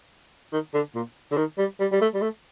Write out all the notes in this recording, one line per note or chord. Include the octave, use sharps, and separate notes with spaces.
D#3
D3
A#2
D3
D#3
G3
G3
G3
A3
G3
A3